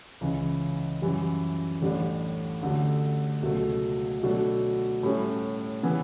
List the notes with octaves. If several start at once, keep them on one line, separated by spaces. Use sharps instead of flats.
C#2 C#3 E3
F#2 E3 G3
A1 A2 G3 D4
D2 D3 A3 C#4 G4
C#2 B2 F#3 A3
B2 F#3 A3 D4
A2 G3 C#4 E4
C#3 E3 B3